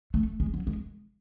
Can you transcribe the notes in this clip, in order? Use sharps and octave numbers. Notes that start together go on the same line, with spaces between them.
A3
G#3
F#3
G#3